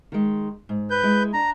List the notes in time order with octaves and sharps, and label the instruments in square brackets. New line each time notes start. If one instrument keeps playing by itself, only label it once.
[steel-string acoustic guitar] D#3 G#3
G#2
[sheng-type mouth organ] B4 G6
[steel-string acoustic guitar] G#3 E4
[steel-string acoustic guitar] D4 [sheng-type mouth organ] A#5